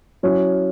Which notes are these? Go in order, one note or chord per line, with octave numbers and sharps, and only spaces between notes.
F#3 C#4 E4